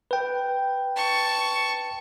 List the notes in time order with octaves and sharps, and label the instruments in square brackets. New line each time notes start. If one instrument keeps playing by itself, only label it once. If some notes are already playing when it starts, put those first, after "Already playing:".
[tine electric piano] B4 G5
[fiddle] A5 C#6